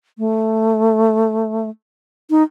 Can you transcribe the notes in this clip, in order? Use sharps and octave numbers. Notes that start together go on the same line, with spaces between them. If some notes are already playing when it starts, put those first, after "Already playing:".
A3
D#4